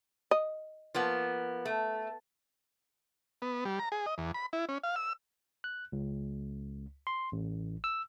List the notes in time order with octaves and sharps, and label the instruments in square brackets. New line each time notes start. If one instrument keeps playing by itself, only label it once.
[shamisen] D#5
[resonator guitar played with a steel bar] F3 A#3 B3
A3
[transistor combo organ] B3
G3
A#5
G#4
D#5
E2
B5
E4
C#4
F5
E6
[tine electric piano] F#6
C#2
C6
A1
E6